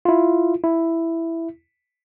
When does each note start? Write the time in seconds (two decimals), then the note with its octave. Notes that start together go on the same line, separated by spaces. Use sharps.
0.05 E4 F4
0.64 E4